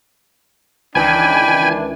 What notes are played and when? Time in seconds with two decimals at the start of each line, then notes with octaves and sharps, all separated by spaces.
0.95 C#2 D#3 E3 D4 G5 G#5 B5